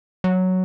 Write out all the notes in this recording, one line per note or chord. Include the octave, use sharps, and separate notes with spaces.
F#3